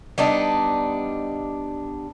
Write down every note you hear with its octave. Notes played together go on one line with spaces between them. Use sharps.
G3 B3 D4 D#4